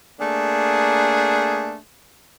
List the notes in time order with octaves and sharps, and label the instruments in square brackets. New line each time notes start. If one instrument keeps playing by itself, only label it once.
[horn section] A3 A#3 D4 G#4